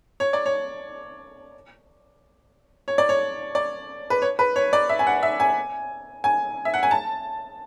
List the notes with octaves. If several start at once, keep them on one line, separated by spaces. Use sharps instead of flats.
C#5
D5
C#5
C#5
D5
C#5
D5
B4
C#5
B4
C#5
D5
E5
G#5
F#5
E5
G#5
G#5
E5
F#5
G#5
A5